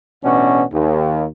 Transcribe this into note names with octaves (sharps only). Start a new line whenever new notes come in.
A1 B2 C#4 D4 F#4
D#2